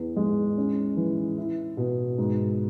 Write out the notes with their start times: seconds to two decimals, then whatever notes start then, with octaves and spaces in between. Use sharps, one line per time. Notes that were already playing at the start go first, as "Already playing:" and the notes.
Already playing: E2 B3
0.17 G#3
0.58 C#4
0.97 E3
1.38 E4
1.77 B2
2.18 G#2